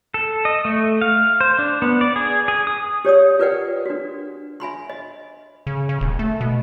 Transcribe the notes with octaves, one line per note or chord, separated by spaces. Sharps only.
A4
D#5
A3
F5
C5
D4
B3
D5
G#4
G#4
D#6
G4 C#5 D5 D#6
F4 A#4 B4 D5 F#5 G5
D4 F#4
E5 G#5 B5 C6
D#5
C#3
C#3
D#1
A3
B2